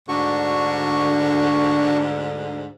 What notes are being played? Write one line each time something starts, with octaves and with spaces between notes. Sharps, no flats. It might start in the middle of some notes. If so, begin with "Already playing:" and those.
D2 G#2 D3 D4 F#4 C#6